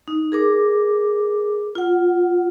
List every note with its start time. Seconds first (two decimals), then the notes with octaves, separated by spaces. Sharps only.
0.08 D#4
0.32 G#4 A#4 D6
1.75 F4 F#5